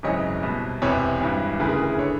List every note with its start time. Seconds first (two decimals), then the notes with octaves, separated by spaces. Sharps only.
0.03 G#1 F#2 C#3 E3 C#5 D#5
0.43 C2 B2
0.81 E1 E2 C3 E3 B4 C#5
1.21 G#1 G2 E3
1.59 D2 C#3 E3 A4 B4
1.69 G#4 A#4
1.79 G#4 A#4
1.98 D3 B4 C#5